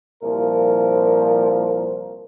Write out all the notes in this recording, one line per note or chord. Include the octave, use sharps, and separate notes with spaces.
C2 A#2 F3 A#4